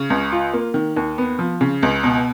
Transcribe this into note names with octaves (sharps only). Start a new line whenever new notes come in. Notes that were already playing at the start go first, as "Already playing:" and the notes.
Already playing: C#3
C#2
F4
A#3
D#3
D#2
B3
F3
C#3
C#2
B2